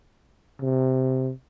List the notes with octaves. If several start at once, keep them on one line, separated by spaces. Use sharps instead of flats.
C3